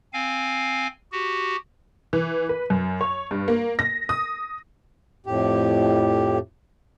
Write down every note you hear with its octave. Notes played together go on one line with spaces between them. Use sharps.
C4 F5 G#5
F#4 G4
E3
B4
F#2
C#5
G2
A#3
A#6
D#6
F2 A2 G4